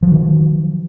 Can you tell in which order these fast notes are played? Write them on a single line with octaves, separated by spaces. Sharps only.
F3 F#3 D#3